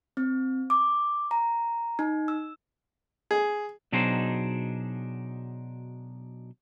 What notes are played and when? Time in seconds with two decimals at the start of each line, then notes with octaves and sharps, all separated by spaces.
0.17 C4
0.70 D6
1.31 A#5
1.99 D#4
2.28 E6
3.31 G#4
3.92 B2 F#3 D4 D#4 G#4 C5